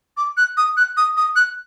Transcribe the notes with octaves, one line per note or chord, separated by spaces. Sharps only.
D6
F#6
D#6
F#6
D#6
D#6
F#6